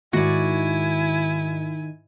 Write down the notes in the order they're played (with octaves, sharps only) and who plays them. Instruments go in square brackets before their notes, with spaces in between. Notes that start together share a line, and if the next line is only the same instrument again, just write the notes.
[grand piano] G#2 [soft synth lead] D#3 [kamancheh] E4 G#5 [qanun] F#4 D5